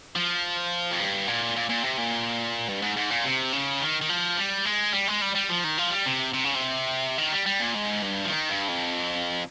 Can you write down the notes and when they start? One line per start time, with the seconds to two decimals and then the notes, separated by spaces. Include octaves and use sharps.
0.16 F3
0.91 F2
1.00 G2
1.28 A#2
1.56 A#2
1.70 A#2
1.85 C3
1.98 A#2
2.69 G2
2.82 G#2
2.97 G#2
3.10 A#2
3.25 C3
3.53 C#3
3.81 D#3
4.02 D#3
4.09 F3
4.37 G3
4.65 G#3
4.93 G3
5.07 G#3
5.21 G3
5.35 G3
5.49 F3
5.64 D#3
5.78 F3
5.91 G3
6.06 C3
6.34 C3
6.44 C#3
6.55 C3
7.18 D#3
7.32 G3
7.46 G3
7.60 A#2
7.75 G#2
8.03 G2
8.25 F3
8.30 D#3
8.50 G2
8.69 F2